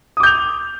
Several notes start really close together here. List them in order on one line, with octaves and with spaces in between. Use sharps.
D#6 D6 G6 F7